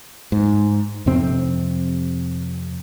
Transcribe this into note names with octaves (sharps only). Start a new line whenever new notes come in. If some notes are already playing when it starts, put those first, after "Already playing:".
G#2
F2 C3 C4